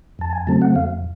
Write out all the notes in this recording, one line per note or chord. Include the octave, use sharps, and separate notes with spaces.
F2 A5
G#5
C#3 F#3 A3 C4 A5
F#5
F2 F5